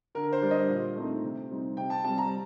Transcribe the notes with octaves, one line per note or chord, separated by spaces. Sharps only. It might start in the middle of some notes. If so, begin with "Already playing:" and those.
D3 A#4
C5
G3 D4
D#5
A#2
A3 C4 D#4
C3
G3 C4 D#4
C3 G5
A5
G3 C4 A5
A#5